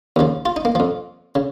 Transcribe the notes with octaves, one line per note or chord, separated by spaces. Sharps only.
D#2 C#3 F3
F4
D#4
A#3
F2 F3
C#3